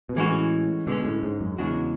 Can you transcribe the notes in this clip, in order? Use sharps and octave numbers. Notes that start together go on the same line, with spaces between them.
B2
A2 E3 G#3 C#4 F#4
B2 D3 G#3 C#4
A2
G#2
F#2
E2 C#3 G#3 D4 F#4